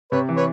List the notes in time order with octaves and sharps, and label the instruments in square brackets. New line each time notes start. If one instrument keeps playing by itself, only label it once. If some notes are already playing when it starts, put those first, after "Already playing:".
[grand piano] C3 [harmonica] B4 C#5
[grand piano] E3
[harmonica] B4 C#5